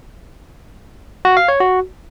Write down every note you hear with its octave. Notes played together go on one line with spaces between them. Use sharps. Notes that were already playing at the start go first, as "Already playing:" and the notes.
F#4
F5
C#5
F#4